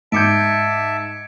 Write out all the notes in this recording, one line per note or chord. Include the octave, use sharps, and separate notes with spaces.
G#2 E5 A5 D6 G6 G#6 C#7 D7